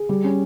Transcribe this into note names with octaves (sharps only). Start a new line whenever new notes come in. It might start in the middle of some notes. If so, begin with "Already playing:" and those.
Already playing: G#4
G3
C#4